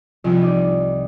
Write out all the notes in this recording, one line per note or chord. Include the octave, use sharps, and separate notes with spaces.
C2 F3 F4
D#4 D5